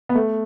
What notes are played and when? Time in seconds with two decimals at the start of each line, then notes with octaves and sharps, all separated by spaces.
0.09 B3
0.15 A3